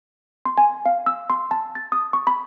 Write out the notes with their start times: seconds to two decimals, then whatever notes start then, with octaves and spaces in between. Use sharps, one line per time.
0.45 C6
0.58 G#5
0.86 F5
1.06 E6
1.30 C6
1.51 A5
1.75 A6
1.92 D#6
2.13 C#6
2.27 B5